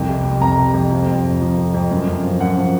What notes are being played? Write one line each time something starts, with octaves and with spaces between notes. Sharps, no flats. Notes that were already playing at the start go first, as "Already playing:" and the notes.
Already playing: C2 F2
C3
F2
F2 A#5
C3
F2
F3
F2
F2
F3
F2
F2
F#2
F#2
F3
F#2 F#5
F3